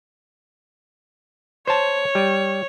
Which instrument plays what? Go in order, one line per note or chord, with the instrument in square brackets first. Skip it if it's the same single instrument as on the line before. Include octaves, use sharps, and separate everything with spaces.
[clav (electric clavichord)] C5 A5 [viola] C#5
[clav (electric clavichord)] G3